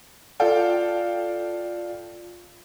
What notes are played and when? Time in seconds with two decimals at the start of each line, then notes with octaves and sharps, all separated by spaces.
0.40 F4 A4 D5 F5 G5